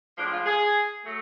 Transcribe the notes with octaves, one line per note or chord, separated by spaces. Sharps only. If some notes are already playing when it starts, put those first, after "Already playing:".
A2 F3 G#3 D4
F4
G#4
F#3 A3